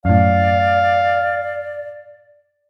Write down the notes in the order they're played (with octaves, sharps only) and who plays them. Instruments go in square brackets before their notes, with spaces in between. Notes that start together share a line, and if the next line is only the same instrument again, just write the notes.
[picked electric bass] F#2 A2 [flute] D5 [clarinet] F5